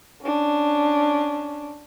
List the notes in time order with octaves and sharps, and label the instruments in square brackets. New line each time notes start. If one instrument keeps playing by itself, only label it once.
[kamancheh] C#4 D4